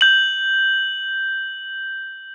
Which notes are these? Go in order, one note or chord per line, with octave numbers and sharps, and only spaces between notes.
G6 F#7